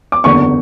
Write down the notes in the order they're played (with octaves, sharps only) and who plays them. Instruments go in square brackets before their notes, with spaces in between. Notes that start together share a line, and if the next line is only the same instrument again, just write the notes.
[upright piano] D6
F#1 E2 D3 C#6